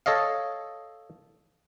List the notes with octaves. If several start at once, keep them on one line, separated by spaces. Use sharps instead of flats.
A4 C#5 D#5 F5